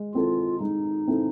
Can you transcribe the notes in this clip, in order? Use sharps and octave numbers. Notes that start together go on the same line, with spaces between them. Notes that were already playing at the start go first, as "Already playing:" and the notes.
Already playing: G#3
C4 E4 F4 A4
G#3 D#4
C4 E4 A4